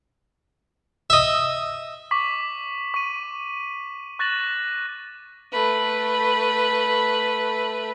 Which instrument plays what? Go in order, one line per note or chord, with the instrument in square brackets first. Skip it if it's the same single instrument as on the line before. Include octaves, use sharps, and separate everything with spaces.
[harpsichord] D#5 E5
[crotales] C#6 D6 B6 F#7
C#6 D#7
C#6 F#6 A6 A#6 E7 F#7
[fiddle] A3 B4